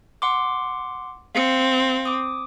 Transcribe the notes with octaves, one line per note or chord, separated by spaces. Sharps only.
F#5 C6 D6
C4 F5 C#7
D6 D#6